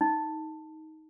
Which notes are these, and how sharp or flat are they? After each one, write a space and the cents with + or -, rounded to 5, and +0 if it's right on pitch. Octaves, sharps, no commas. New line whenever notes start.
D#4 +15